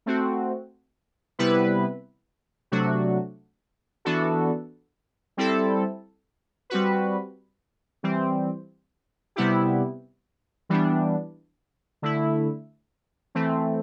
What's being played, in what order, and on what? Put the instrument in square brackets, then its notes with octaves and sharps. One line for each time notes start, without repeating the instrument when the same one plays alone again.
[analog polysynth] A3 C4 F#4
C3 G3 B3 E4 B4
C3 F#3 A3 D4 F#4
E3 B3 D4 F#4 A4
G3 C4 E4 A4
G3 C4 F#4 B4
E3 G3 C4
C3 G3 B3 E4 G4
E3 G3 B3 D4
D3 A3 E4
E3 A3 C4